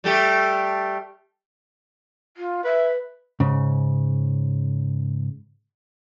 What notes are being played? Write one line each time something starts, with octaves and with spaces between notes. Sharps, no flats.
G3 A3 G4
F4
B4 E5
G#2 C#3